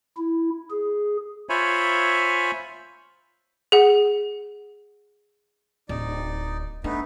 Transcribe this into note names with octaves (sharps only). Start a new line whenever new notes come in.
E4
G#4
F4 C5 C#5 E5 G#5 B5
G#4 F#5
D1 D#4 D5
A3 B3 D4 D#4